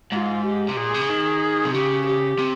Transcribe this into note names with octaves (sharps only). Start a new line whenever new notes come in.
G#2 F4
G4
C3
A#2 G#4
C3
C#3
D#3
C3
C#3 G4
G4
C3